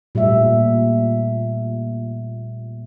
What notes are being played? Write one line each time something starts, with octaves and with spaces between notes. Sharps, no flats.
A#2 G3 A3 E5